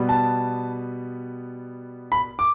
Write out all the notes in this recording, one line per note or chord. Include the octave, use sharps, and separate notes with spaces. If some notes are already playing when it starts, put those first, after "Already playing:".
Already playing: B2 G3 B3
A5
B5
D6